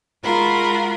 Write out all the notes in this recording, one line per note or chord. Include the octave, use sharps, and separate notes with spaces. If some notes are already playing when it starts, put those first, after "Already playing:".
G#3 F4 F#4 A#4 B5